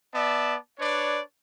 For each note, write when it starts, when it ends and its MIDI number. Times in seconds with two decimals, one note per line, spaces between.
0.13 0.56 59
0.13 0.56 74
0.13 0.56 76
0.13 0.56 81
0.79 1.20 62
0.79 1.20 71
0.79 1.20 73
0.79 1.20 74